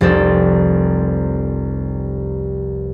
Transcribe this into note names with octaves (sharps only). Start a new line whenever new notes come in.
F1 C2 C4 A4